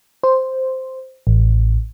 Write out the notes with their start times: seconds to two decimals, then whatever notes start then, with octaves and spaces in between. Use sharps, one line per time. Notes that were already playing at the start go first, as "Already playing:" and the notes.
0.23 C5
1.27 A1